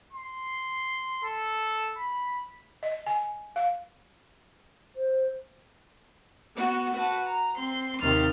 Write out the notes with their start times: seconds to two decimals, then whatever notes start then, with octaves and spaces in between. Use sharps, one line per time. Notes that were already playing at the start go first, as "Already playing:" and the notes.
0.12 C6
1.24 A4
1.98 B5
2.83 D#5
3.06 G#5
3.56 F5
4.96 C5
6.55 B3 F#4
6.95 F#4 B4 A5
7.25 A#5
7.57 C4 C6
8.01 D#2 C3 D#3 C6 F6 A6